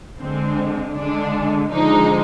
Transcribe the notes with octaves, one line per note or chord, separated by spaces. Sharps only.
D3 G#3 C4
D3 G#3 D4
D3 F3 G#3 D#4